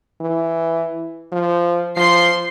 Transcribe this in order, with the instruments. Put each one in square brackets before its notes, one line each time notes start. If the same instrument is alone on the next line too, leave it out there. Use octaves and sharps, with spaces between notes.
[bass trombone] E3
F3
[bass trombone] F3 [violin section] C6 C7